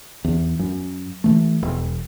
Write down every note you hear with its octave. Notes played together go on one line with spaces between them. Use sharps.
E2
F#2
E3 A3
E1